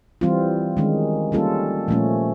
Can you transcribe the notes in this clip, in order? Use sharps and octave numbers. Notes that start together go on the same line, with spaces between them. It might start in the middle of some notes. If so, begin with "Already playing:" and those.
E3 G3 C4 F4
D#3 G#3 C#4
G3 A#3 C#4 F4 A4
A#2 F3 A3 C#4